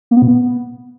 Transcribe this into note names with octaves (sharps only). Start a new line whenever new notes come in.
A#3
B3
B2
B3